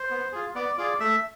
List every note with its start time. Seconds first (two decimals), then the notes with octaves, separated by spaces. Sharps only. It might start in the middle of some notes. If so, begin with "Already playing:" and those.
Already playing: C5
0.10 B3
0.32 F4 G#4
0.55 B3 D5
0.78 F4 G#4 D5
1.00 A3 E5